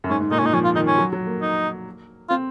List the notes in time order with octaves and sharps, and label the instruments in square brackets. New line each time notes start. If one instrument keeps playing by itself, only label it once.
[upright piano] F#2
[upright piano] G#2 [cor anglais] C#4
[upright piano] G#2
[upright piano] A#2 [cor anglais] D#4
[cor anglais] C#4
[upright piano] A#2 [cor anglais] D#4
[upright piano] F3 [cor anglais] C#4
[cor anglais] F4
[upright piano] D#3 [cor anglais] D#4
[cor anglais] C#4
[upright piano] F#3
F#3
A#3
[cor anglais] D#4
[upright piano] C4 [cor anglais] F4